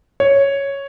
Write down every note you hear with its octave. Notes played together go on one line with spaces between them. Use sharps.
C#5